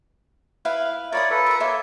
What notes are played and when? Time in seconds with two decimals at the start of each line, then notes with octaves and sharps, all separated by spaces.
0.65 E4 B4 F5
1.12 F4 A#4 C#5 D5 B5 D#6
1.30 A4 B4
1.46 A#4 A#5
1.60 A#3 C#5 E5 C6